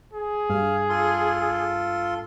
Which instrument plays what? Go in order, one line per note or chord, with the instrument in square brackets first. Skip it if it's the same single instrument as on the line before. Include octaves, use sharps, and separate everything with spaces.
[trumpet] G#4
[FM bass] G2 [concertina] F5
[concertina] F4 A4 C6